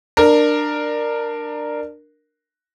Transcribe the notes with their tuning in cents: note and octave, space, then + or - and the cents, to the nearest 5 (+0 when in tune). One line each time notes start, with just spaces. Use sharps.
D4 +20 A#4 +0